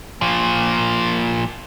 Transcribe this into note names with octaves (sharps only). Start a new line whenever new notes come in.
A#2 F3